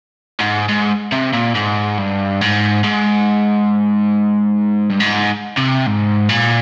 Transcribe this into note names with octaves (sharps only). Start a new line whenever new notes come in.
G#2
G#2
C3
A#2
G#2
G2
G#2
G#2
G2
G#2
C3
G#2
A#2